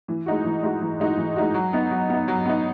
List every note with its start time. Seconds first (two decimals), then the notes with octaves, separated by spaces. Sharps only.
0.08 E3
0.26 G#3 D#4 F#4
0.45 E3
0.63 G#3 D#4 F#4
0.81 E3
1.00 G#3 D#4 F#4
1.17 E3
1.36 G#3 D#4 F#4
1.54 F#3
1.73 B3 D#4
1.91 F#3
2.09 B3 D#4
2.28 F#3
2.45 B3 D#4